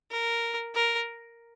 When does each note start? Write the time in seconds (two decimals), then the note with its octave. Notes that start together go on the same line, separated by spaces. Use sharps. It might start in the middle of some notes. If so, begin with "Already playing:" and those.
0.12 A#4
0.75 A#4